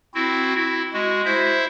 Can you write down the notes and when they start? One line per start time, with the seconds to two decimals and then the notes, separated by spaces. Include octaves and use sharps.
0.14 C4 E4 F#4
0.56 E4
0.93 G#3 F#4
1.25 E4 C5 E5